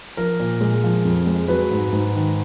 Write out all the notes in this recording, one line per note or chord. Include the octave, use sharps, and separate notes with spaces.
F3 A#4
A#2
G#3
F3
F2
G#3
F#3 B4
G#2
G#2
D#3